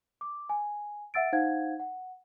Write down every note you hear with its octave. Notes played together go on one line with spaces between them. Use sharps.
D6
G#5
E5 F#5 E6 A6 D7
D#4 C5 F5 F#5 G#6
F#5